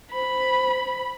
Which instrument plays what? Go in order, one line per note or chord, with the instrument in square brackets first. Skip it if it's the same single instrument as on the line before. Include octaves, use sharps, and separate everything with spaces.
[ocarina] C5 [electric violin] B5